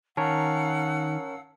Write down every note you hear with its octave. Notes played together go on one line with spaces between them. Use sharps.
D#3 C#4 A#4 C#5 F5 F#5 A5 E6